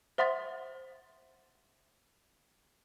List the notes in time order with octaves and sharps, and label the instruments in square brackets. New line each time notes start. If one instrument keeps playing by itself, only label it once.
[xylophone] C5 E5 F#5 C6 D#6 A6